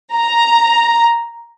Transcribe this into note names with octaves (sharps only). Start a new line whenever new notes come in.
A#5